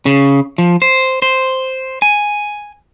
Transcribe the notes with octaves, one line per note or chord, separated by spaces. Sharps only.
C#3
F3
C5
C5
G#5